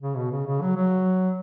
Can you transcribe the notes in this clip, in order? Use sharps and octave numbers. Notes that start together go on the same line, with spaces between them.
C#3
B2
C#3
C#3
F#3
F#3